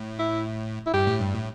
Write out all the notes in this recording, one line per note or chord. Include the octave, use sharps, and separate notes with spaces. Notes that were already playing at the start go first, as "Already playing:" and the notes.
Already playing: A2
E4
E4
G2 G4
A2
G2
A2